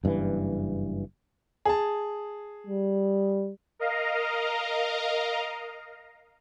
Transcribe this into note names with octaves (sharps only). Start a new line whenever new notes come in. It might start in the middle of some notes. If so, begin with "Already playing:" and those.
F#1 G2 A#2 E3
G#4 A5
G3
A#4 D#5 F5 A#5